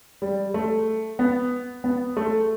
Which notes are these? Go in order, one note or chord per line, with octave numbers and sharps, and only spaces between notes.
G3
A3
B3
B3
A3